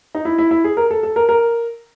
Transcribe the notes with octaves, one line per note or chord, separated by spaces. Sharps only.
D#4
E4
E4
E4
G#4
A#4
A4
A4
A#4
A#4